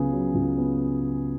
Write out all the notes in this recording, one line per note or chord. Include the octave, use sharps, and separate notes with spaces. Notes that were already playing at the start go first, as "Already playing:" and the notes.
Already playing: C#2 C#3 F#3 B3 G#4
F#3
C#2
B3